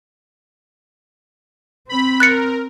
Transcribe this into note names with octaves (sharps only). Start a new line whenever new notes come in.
C4 B5
A#4 F#6 A6 C#7